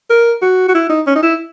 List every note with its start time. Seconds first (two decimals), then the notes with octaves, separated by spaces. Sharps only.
0.10 A#4
0.42 F#4
0.68 F#4
0.75 E4
0.90 D#4
1.07 C#4
1.15 D#4
1.23 E4